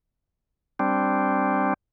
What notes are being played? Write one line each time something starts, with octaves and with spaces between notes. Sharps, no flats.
G3 C4 D4